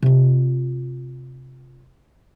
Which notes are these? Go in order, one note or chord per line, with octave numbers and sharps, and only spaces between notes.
C3 F4